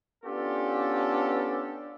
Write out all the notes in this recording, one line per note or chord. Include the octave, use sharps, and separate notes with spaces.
B3 C#4 D4 F4 G4 A4